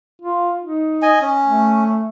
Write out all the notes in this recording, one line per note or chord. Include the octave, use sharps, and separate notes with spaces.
F4
D#4
D#5 G#5
C#4
A3